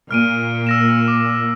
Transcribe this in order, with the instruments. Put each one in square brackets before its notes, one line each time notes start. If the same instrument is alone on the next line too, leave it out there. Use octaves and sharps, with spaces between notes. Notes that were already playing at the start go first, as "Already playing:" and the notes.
[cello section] A#2 [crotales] F6 D7 D#7
[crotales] E6 A#6 E7
D6